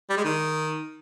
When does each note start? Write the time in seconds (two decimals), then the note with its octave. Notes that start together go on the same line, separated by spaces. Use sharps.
0.10 G3
0.17 G#3
0.25 D#3